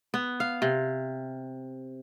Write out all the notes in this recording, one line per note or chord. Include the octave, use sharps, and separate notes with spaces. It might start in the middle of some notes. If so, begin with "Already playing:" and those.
B3
F5
C3